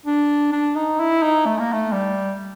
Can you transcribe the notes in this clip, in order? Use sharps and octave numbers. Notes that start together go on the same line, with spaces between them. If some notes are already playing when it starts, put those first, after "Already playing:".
D4
D4
D#4
E4
D#4
A3
A#3
A3
G3